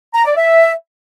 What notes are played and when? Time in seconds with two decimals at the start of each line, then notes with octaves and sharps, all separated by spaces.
0.14 A#5
0.25 D5
0.36 E5